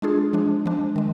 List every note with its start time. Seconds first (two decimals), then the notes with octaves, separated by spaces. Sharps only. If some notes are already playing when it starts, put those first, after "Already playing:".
0.02 G#3 D4 F4 G#4
0.33 F3 G#3 D4
0.66 F3 G#3 D4
0.96 D#3 G#3